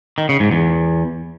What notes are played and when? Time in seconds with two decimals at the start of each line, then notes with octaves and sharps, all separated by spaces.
0.18 D#3
0.29 C#3
0.40 G#2
0.51 E2